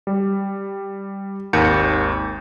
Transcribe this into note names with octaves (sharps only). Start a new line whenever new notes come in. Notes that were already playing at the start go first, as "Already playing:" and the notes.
G3
G#1 D#2 A#4 G6 C#7